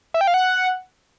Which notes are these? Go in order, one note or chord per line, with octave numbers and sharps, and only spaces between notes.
E5
G5
F5
F#5